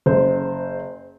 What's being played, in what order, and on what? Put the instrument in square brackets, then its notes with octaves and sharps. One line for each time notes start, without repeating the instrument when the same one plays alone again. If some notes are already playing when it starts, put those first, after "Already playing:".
[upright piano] F#1 C5